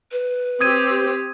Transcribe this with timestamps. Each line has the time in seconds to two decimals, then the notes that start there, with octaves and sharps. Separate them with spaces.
0.12 B4
0.61 C4 G4 D#6 G#6 D#7